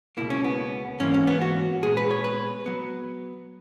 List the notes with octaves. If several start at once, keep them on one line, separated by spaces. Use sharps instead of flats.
C#2 B2 A#3 E4
C#4
B3
G#2 E3 A#3 C#4
C#4
B3
F#4
A#2 G#3 B3 G#4
B4
C#5
B4
F#3 B3